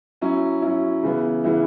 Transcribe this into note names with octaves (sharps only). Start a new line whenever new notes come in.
F#3 C#4 E4
F#3 C#4 E4
C#3 E3 B3 E4
C#3 E3 B3 E4